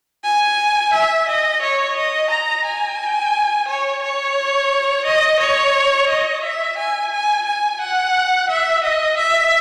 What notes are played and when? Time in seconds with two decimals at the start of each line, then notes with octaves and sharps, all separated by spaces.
0.24 G#5
0.93 E5
1.28 D#5
1.62 C#5
1.97 D#5
2.30 A#5
2.64 G#5
3.68 C#5
4.02 C#5
5.05 D#5
5.40 C#5
6.09 D#5
6.43 E5
6.78 G#5
7.11 G#5
7.46 G#5
7.81 F#5
8.49 E5
8.83 D#5
9.17 E5